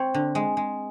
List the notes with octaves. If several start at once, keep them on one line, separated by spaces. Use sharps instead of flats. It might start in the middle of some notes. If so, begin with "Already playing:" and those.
Already playing: C4 C#5
D3
G#3
G#3